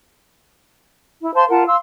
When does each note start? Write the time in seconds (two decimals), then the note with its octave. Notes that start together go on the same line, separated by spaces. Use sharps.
1.23 E4
1.34 C5 F5 A5 C6
1.50 F4 A#4 F#5 A5
1.66 F5 C6 E6